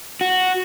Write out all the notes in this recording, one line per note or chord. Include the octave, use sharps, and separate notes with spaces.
F#4